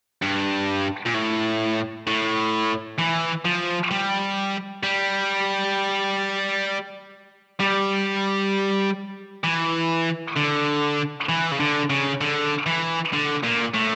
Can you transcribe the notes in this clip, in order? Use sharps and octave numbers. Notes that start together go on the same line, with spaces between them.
G2
A#2
A2
A2
E3
F3
G3
G3
G3
E3
D3
E3
C#3
D3
C#3
D3
E3
D3
A#2
A2